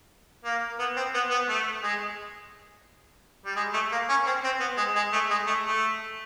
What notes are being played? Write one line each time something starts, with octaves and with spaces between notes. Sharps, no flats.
A#3
B3
C4
B3
B3
A3
G#3
G3
G#3
A3
A#3
C#4
C4
C4
B3
G#3
G#3
A3
G#3
A3
A3